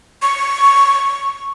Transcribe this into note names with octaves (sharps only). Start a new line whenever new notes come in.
C#6